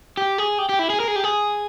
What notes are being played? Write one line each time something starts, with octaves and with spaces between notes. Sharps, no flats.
G4
G#4
G4
G4
E4
G#4
A#4
G#4
G4
G#4